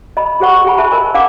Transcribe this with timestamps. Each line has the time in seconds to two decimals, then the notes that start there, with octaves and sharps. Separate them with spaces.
0.17 D#5 B5
0.40 G4 G#4 C5 F#5 C#6
0.65 G4 G#4 G#5 B5
0.78 G#4 C5 E5 A5 B5 C6
0.92 A#4 D#5 G#5
1.14 D4 F5 F#5 G#5 D6